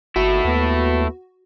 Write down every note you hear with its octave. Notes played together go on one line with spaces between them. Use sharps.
G1 A#2 A3 D#4 E4 F#4
D#2 B3